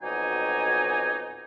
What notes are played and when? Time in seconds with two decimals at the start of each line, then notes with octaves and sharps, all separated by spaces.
0.03 F2 B2 F#3 D#4 D5 G#5